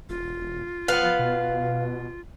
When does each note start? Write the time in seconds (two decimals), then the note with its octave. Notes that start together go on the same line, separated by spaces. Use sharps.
0.09 E1 F4
0.88 F3 B4 F5 F#5
1.19 B2